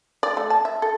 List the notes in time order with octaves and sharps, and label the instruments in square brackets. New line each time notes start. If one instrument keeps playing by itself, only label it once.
[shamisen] D5
A3
A5
E5
A4